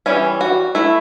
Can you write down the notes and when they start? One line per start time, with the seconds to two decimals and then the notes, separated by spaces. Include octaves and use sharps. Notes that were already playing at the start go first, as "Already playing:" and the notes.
0.06 E3 G3 C#4 E4
0.41 F#4
0.75 A3 E4